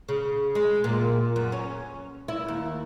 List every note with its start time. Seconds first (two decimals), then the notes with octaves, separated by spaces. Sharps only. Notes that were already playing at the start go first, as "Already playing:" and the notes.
0.09 C#3
0.55 G#3
0.84 A#2
1.36 F#2
1.52 C#4
2.28 E4
2.48 D#2